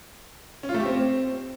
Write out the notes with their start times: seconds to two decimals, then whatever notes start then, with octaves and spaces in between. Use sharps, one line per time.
0.63 C#4
0.69 F4
0.74 A3
0.80 G4
0.86 C4